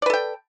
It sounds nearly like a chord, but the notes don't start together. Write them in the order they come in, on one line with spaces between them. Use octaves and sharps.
D5 B4 A4 G5